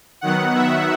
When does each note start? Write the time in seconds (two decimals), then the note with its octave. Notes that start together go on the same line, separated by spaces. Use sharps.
0.21 D#3 F#3 B3 F#5
0.55 E5